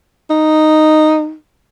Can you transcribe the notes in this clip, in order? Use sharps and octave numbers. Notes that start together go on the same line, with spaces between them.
D#4